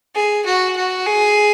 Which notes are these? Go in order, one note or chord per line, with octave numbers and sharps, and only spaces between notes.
G#4
F#4
F#4
G#4